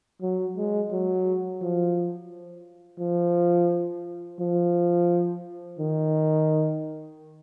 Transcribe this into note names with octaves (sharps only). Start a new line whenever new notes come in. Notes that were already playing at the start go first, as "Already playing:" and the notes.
F#3
G#3
F#3
F3
F3
F3
D#3